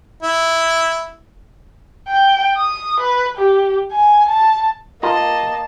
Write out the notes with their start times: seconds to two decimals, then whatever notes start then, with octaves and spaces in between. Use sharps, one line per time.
0.23 E4
2.08 G5
2.57 D#6
3.00 B4
3.37 G4
3.92 G#5
4.29 A5
5.03 A#3 F4 A#4 D#5 A5